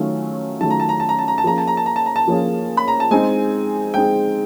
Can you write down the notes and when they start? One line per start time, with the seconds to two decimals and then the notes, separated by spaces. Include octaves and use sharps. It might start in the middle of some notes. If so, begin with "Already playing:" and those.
Already playing: D#3 F#3 A3 C#4 F4
0.61 D#3 F#3 A3 C#4 F4 A5
0.71 A#5
0.80 A5
0.89 A#5
1.00 A5
1.09 A#5
1.19 A5
1.28 A#5
1.38 A5
1.44 F3 A#3 C#4 F4 G#4 A#5
1.58 A5
1.67 A#5
1.77 A5
1.86 A#5
1.96 A5
2.06 A#5
2.16 A5
2.28 F3 A#3 C#4 F4 G#4
2.77 B5
2.88 A#5
3.00 A5
3.11 G#3 C4 D#4 G#4 G#5
3.94 G#3 C4 D#4 G#4 G5